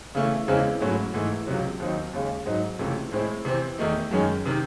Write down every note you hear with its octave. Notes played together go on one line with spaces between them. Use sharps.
C#3 E3 A3
E2 C#3 E3 G#3 C4
G#2 F#3 A3 C#4 E4
G#2 E3 A3 D#4
C#2 C3 F#3
D#2 D#3 F#3 C4 D#4
D#2 C#3 G#3
G#2 F#3 C4 D#4
C#2 C3 E3 A3
A2 G#3 C4 E4
C3 E3 C4
E2 D#3 A3 D#4
F#2 D#3 G#3 C#4
C3 D#3